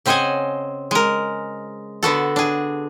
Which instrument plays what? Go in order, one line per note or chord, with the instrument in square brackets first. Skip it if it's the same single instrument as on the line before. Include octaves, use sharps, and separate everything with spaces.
[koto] C#3 C4 C5 D#5 F#5 G#5
G#3 A#4
D3 B3 F#4 A4
D4 G#4